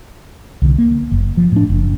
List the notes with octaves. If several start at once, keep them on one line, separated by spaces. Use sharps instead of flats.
C2 D3
A#3
F#1
F3
A2 D4
F#1